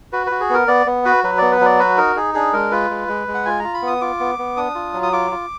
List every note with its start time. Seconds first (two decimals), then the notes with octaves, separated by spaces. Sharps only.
0.12 F#4 B4
0.27 F#4 B4
0.40 G#4
0.50 B3 A#4
0.68 B3 D5
0.86 B3
1.05 F#4 B4
1.24 F#3 B4
1.38 B3 D5
1.52 B4
1.61 F#3 D5
1.79 F#4 B4
1.97 D#4 A#4
2.16 D#4 G#4
2.34 D4 G#4
2.53 G#3 A#4
2.71 F4 B4
2.90 G#3
3.08 G#3
3.27 G#3
3.34 F#5
3.45 F4 G#5
3.59 F4 A#5
3.74 B5
3.82 B3 D#6
4.01 F4 D6
4.20 B3
4.39 B3
4.57 D4 D#6
4.75 F4
4.94 F#3
5.03 D#6
5.13 F4 D6
5.31 F4